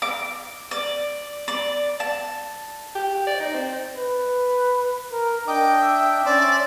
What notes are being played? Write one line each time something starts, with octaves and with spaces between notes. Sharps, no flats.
D6
D5
D5
A5
G4
D5
D#4
C4
B4
A#4
D4 D#5 G5 D6
E5
C#4 C5 D5 E5